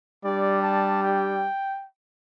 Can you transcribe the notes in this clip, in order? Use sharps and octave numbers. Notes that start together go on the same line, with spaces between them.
G3 D4 G4 D5
A5
G5